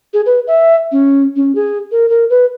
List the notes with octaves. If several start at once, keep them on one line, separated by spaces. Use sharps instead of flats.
G#4
B4
E5
C#4
C#4
G#4
A#4
A#4
B4